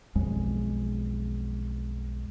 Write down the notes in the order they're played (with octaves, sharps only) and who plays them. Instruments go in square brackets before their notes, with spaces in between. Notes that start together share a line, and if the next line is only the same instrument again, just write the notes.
[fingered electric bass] B1 F2 G#3